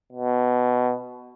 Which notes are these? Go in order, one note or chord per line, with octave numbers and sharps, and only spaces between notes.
B2